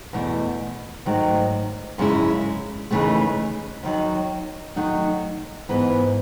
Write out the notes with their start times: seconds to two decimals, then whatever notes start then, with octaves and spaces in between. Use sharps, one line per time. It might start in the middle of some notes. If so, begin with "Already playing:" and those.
0.13 E2 B2 A3 E4
1.06 G#2 D#3 F#3 A3
1.98 F#2 C#3 G#3 C#4 E4
2.91 D#2 C#3 E3 A3
3.83 D#2 D#3 F#3
4.76 D#3 F#3 A3 D#4 F#4
5.69 G#2 E3 B3